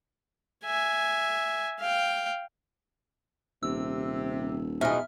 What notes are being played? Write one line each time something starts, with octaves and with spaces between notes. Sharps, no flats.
E5 G#5
F5 G5
D#1 C3 E6
E2 B2 F3 G#3 D#4 E5 F6